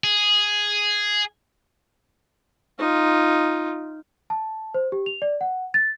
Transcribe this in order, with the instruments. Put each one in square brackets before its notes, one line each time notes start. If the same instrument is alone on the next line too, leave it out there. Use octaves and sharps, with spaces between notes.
[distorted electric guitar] G#4
[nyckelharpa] D#4 F4
[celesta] A5
C5
G4
F7
D5
F#5
A6